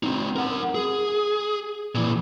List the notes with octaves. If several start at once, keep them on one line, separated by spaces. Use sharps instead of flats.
C4 D#4
A#4 F#5
G#4
A#2 E3